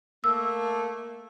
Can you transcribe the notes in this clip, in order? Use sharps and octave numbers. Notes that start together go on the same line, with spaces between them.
A3 A#3 E6